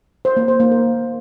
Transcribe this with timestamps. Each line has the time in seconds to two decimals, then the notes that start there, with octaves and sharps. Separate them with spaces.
0.25 C5
0.37 A#3
0.48 C5
0.60 A#3
0.71 A#4